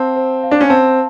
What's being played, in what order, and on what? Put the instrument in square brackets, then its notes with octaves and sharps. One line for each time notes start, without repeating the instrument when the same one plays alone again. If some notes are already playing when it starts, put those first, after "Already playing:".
Already playing: [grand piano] C4 [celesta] F5 A5 C6
[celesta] C5
F5
[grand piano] D4
C#4
[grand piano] C4 [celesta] A5